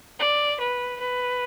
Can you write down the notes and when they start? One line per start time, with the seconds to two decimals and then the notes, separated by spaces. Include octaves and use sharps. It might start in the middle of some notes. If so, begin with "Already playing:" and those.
0.20 D5
0.60 B4
1.00 B4